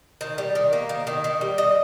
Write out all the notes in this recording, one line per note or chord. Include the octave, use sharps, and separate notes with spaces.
D#3
G3
D#3
A#3
D#3
D#3
D#3
G3
D#5